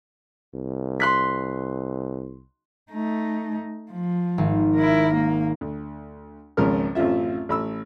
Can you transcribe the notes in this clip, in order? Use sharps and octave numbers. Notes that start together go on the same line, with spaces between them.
C2
C6 F#6 B6
A3 D#4
F3
G#1
E4 A#4
A#3
D2
G#1 C#2 F3 C#4 A#4 F6
A1 F#2 C4 F4 E5
A1 B5 E6